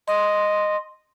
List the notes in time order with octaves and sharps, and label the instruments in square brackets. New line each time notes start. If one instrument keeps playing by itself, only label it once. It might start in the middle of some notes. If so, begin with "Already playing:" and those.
[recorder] D#5 [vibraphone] C6